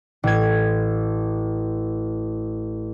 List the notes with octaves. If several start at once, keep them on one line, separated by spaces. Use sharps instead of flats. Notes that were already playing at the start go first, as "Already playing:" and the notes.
A1 G#6